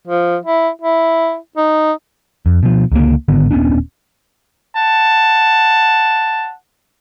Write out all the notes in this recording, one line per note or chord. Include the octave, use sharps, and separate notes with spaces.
F3
E4
E4
D#4
F2
B2 F3
C#2 D3 A#3
G#1 D3 D#3 B3
D#1 B3 C#4 D4
F#5 A5